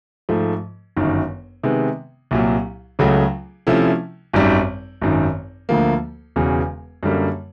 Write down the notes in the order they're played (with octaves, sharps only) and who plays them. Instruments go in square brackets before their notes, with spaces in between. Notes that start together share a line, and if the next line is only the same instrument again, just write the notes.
[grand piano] G#2 F3 A3
G1 F#2 D#3
C3 D#3 G#3 B3
C2 A#2 F#3
C#2 C#3 F#3 A3
C3 F3 A3 C#4 E4
G#1 F#2 D#3 G3
G#1 F#2 D#3
D2 D3 F3 A#3
E1 E2 C#3
F#2 D3 G3 A#3